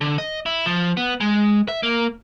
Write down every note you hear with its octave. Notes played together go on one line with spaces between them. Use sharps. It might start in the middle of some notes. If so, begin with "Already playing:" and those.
D3
D#5
E4
F3
B3
G#3
E5
A#3